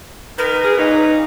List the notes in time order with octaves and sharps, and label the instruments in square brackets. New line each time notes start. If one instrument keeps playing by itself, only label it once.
[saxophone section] D#3 A#4 [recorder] B4
[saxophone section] G#4
A#2 C#4 D#4